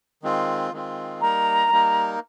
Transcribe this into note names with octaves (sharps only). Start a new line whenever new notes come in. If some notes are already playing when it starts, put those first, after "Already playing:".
D#3 G#3 C4 F4
D#3 G#3 C4 F4
G3 A#3 D#4 A#4 A#5
G3 A#3 D#4 A#4